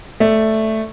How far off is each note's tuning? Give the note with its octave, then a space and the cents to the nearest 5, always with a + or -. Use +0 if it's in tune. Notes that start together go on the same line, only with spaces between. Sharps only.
A3 +0 D5 +0